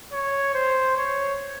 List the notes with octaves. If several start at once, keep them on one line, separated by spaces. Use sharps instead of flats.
C#5
C5
C#5